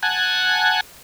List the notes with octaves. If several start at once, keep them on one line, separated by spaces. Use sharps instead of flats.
F#5 G#5 A5 F#6 G#6